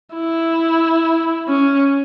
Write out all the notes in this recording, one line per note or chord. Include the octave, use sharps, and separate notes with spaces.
E4
C#4